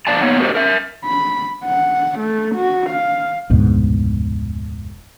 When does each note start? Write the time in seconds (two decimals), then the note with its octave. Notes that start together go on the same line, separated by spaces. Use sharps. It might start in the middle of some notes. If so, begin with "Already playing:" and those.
0.07 B2 F3 D5 F5 A5 A#5
0.21 A#3 B3 D#4 C#5
0.39 D4 F#4 G4 A#4 C5 D#5
0.55 A#4 E5
1.05 B5
1.65 F#5
2.19 A3
2.55 F#4
2.89 F5
3.50 F1 D2 G#2 B2